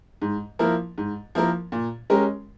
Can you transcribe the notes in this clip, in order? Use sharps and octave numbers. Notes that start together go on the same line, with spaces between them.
G#2
F3 A#3 E4 A#4
G#2
F3 A#3 E4 A#4
A#2
G#3 C#4 G4 A#4